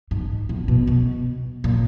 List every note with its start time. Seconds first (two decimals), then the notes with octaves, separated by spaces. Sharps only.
0.11 G#2
0.49 A2
0.68 B2
0.87 B2
1.64 A#2